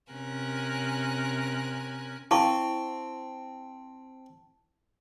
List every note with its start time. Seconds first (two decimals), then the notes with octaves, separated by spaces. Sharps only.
0.11 C3 C#4 A#4 G#5 F#6
2.31 C4 E4 F5 A5 C#6